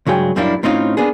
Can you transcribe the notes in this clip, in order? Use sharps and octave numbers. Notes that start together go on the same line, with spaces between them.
C#2 G2 F#3 G#4 G5
F#2 A#2 G3 A#3 D4 E4
A2 C4 C#4 D#4 F4
A#3 B3 D4 G#4